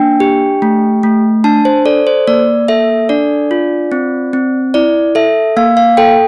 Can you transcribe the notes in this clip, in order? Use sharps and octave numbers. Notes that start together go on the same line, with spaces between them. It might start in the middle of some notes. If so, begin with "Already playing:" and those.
Already playing: A#3 D4 G5
G4
A3
A3
D4 A5
C5
A4 D5
C5
A#3 D5
A4 E5
D4 D5
F4
C4
C4
E4 D5
A4 E5
A#3 F5
F5
A4 G5